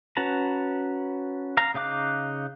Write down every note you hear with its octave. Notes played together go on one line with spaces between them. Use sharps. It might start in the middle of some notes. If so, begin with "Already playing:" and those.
C#4 F#4 B4 A5 A#5
F5 A#5
C#3 D#4 F5 D6 F#6